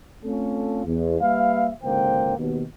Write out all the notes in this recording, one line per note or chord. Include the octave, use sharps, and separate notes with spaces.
A3 C4 C#4 F4 A4
E2
G3 A#3 B4 E5 F5
G#1 C#2 D3 A#3 C5 G5
D#2 B2